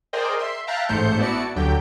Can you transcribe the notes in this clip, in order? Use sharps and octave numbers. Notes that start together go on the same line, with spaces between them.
G#4 A#4 C5 D5 D#5 G5
E5 C6
E5 F5 G5 A5 A#5 F#6
A1 G#2 A3 C5 G6 C#7
B3 E4 F#4 D5 A5 C#7
D2 D3 F#3 G4 G5